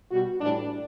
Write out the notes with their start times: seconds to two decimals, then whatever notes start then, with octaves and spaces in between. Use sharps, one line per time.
0.11 B2 G3 F#4
0.41 A2 E3 G3 D4